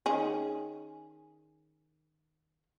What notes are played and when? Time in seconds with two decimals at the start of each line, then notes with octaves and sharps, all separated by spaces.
0.06 D#3 C#4 G#4